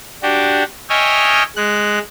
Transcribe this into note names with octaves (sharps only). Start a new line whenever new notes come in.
D4 F#4 G4
C#5 D#5 E5 G5 G#5 F6
G#3 F#6